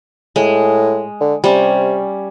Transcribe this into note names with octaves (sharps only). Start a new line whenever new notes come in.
A2 G#3
D3
C3 G3 C#4